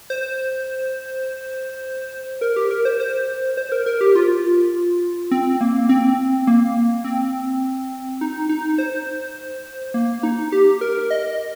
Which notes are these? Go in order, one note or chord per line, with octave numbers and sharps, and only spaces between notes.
C5
A#4
G4
A#4
C5
C5
C5
A#4
A#4
G4
F4
C4
A#3
C4
A#3
C4
D#4
D#4
C5
A#3
D#4
G4
A#4
D#5